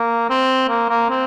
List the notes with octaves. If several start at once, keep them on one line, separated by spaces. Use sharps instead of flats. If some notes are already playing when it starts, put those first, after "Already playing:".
Already playing: A#3
C4
A#3
A#3
C4